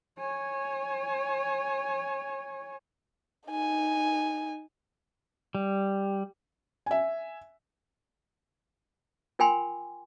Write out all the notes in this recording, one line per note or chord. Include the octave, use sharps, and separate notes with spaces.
C#5 G#5
D#4 G#5
G3
E5 G#5
F4 A#4 G5 G#5 B5 C6